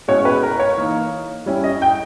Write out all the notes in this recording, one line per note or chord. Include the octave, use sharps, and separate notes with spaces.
B2 G#3 C#4 E4 C#5
B4
A#4
C#5
E3 A#3 D#4
G3 C#4 E4
D#5
G5